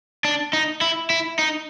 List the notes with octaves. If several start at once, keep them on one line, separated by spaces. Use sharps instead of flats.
D4
D#4
E4
E4
D#4